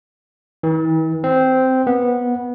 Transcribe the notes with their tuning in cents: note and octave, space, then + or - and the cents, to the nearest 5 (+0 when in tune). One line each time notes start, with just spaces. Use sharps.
E3 -45
C4 -10
B3 -15